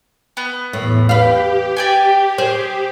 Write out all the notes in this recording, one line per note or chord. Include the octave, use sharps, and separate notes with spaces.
B3
E2 A2
G4 B4 F5
D5 G5 G#5
G#4 C5